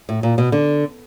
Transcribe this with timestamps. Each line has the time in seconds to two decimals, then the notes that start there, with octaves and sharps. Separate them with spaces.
0.09 A2
0.23 A#2
0.38 B2
0.52 D3